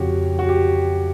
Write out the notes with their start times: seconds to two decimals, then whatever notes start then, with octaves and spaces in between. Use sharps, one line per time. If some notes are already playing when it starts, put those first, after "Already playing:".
Already playing: F2 C#3 F#3 F#4 G4 C#5
0.39 F#4
0.49 G4